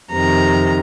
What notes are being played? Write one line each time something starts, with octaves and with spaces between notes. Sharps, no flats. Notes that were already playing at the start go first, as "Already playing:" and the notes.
F2 C3 D#3 A#5